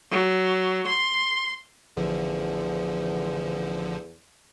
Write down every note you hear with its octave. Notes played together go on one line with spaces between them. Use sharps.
F#3
C6
A1 E2 D3 F3